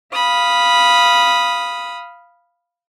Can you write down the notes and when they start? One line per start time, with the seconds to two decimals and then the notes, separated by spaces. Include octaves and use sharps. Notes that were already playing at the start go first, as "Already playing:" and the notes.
0.13 F5 B5 D#6